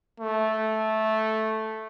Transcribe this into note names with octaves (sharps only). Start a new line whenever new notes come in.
A3